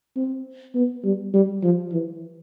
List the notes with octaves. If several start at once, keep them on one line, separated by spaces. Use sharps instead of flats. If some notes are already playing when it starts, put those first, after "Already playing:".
C4
B3
G3
G3
F3
E3